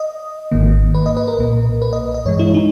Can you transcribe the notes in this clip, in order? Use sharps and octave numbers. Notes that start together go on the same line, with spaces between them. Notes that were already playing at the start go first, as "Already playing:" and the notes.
Already playing: D#5
G#1 G#2 D#3 A#3
B4
D#5
B4
A#4
B1 A#2 A#3
B4
D#5
D#5
G2 E3 G#3 C#5
E4
D#4